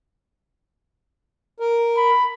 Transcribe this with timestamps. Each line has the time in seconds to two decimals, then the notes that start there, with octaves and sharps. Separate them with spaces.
1.60 A#4
1.97 B5